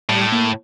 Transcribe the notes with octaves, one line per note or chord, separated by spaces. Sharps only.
A2 G3
A#3